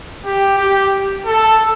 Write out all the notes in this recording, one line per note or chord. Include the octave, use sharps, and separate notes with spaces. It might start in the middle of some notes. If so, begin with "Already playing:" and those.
G4
G4
A4